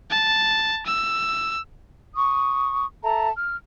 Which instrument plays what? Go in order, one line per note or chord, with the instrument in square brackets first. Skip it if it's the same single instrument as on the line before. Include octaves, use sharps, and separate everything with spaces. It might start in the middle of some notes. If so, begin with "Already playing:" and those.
[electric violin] A5
E6
[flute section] C#6 D#6
A4 E5 A5 A#5
F6